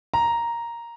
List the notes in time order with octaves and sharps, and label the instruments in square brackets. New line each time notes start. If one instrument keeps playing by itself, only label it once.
[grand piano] A#5